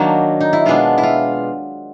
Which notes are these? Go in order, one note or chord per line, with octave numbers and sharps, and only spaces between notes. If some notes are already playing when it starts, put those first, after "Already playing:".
Already playing: D#3 F#3 A#3 D4
D#4
E4
B2 G#3 B3 D4 F4
E4
F4